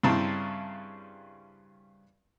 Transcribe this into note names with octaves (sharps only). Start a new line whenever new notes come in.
G2 C#3 C4 E4 A5 A#5